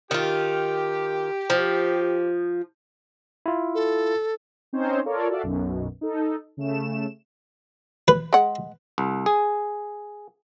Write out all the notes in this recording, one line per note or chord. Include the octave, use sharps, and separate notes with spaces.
D#3 F4 G4
F3
E4 F4
A4
C4 C#4 D#4 C5 C#5
F4 A4 A#4 C#5 D5
F#4 A4 D5 E5 F5
B1 F#2 B2
D#4 A4
C#3 A3 E7
B4
G#3 F#5
C2
G#4